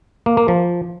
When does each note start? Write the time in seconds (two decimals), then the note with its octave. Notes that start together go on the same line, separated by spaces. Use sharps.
0.26 A#3
0.37 A#3
0.48 F3